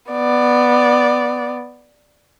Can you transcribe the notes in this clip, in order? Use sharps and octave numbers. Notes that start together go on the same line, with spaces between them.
B3 D5